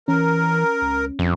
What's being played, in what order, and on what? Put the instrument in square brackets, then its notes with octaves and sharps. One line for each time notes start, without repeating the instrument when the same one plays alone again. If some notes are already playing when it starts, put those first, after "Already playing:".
[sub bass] E3 [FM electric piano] C#4 [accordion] A#4
[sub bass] C#2
[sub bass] E1 [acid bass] F2